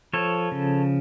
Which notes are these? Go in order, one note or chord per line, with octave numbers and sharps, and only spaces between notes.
F3 A4 C#5
C#3